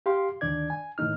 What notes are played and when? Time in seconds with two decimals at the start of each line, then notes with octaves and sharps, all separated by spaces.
0.06 G4 F5 C6
0.41 D2 D#3 D4 D5 G#6
0.70 G#5
0.98 A2 D#3 A#3 D#4 F6